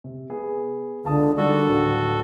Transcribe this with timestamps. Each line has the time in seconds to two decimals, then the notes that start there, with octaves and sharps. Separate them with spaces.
0.04 C3
0.30 B3 G#4
1.05 C#2 D3 A5 D#6
1.37 D3 D#3 G3 D4 F#4 A4
1.68 D1